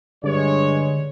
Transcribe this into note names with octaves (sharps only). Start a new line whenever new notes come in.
G2 D3 G#3 C#5